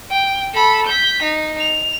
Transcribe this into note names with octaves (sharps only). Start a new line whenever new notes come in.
G5
A4 B5
G6 B6
D#4
F7